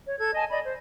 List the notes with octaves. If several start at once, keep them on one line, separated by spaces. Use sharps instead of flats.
C#5
A4 G#6
D#5 G#5 A5
D5 D#5 B5
C5